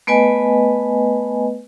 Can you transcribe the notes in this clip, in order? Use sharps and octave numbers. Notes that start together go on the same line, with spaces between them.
A3 B3 B4 D#5 G#5